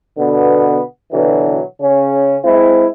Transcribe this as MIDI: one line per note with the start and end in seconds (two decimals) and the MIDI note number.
0.17 0.79 47
0.17 0.79 50
0.17 0.79 59
1.11 1.60 47
1.11 1.60 50
1.11 1.60 52
1.11 1.60 54
1.81 2.36 49
1.81 2.36 61
2.45 2.86 56
2.45 2.86 60
2.45 2.86 64